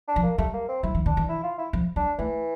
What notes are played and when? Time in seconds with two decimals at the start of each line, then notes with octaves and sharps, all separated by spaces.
0.08 D4
0.16 F3
0.23 A#3
0.38 G3 A3
0.54 A#3
0.69 C4
0.83 G3 E4
0.95 E3
1.06 D3 D4
1.17 E3
1.29 E4
1.44 F4
1.58 E4
1.73 F3
1.96 G3 D4
2.18 E3 A3